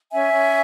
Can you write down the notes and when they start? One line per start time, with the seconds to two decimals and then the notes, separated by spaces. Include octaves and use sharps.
0.11 C#4 E5 G#5
0.32 C#4